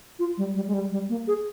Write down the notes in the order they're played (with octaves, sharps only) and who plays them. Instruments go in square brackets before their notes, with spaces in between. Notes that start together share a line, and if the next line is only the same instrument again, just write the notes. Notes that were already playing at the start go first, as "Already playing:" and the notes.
[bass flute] F4
G3
G3
G#3
G3
G3
A#3
G#4